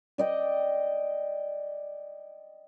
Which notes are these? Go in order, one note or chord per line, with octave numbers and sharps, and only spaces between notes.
D5 D#5 G5